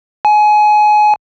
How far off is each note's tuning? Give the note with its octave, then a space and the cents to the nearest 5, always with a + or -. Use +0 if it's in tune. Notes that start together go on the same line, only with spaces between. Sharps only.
G#5 +25